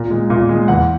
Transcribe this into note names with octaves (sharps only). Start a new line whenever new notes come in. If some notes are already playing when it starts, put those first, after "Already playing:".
Already playing: A#2
G#3
A#2
G#3
E2 F#5